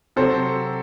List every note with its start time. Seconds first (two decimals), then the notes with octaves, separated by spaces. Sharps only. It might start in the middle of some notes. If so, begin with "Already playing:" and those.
0.16 C3 F#3 A4 C5